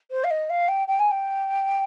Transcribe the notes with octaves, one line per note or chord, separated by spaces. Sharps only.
C5
F5
D#5
F5
G5
G5
G#5
G5